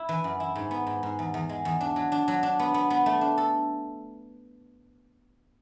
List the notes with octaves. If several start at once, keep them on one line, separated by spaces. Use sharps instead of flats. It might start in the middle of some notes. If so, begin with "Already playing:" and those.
Already playing: E4
E3
F#2
E4
G#2
B3
G#2
G#2
E2
E2
G#3
E2
D4
F#3
D4
F#3
D4
B3
B3
B3
A3
D4
A4